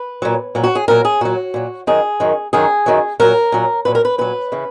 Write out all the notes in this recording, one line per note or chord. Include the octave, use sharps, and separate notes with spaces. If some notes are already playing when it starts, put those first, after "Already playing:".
Already playing: B4
A#2 F#3
A#2 F#3
F#4
G#4
A#2 F#3 A#4
G#4
A#2 F#3 F#4
A#2 F#3
F#2 D#3 F#3 G#4
F#2 D#3 F#3
F#2 D#3 F#3 G#4
F#2 D#3 F#3
A#2 F#3 A#4
A#2 F#3
A#2 F#3 B4
A#4
B4
A#2 F#3 B4
C#3 E3